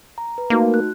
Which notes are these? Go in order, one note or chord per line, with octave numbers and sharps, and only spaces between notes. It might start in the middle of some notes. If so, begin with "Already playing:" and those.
A#5
B4
A3 A#3 D#4 F#4
F#6